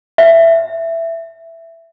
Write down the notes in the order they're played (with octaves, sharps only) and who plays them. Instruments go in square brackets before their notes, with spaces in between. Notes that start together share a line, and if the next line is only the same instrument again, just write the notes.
[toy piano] E5